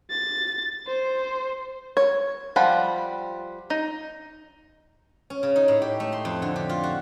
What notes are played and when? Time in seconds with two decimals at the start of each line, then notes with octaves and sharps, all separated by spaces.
0.10 A6
0.87 C5
1.97 C#5
2.56 F3 G3 F#5 B5
3.70 D#4
5.30 C#4
5.43 C#3
5.56 D#4
5.68 A2
5.82 G4
6.00 A3
6.12 C6
6.25 F2
6.42 D3
6.56 G4
6.69 F4
6.83 F#4